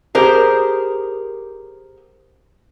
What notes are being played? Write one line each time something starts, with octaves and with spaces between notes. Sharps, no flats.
G4 G#4 A#4 C5